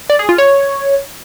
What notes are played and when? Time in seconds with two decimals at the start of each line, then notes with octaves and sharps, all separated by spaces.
0.10 D5
0.19 G#4
0.29 F4
0.38 C#5